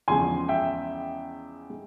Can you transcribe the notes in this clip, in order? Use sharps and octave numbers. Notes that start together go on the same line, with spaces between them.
E2 C#3 F3 G#3 G#5 C6
E5 G5
G#3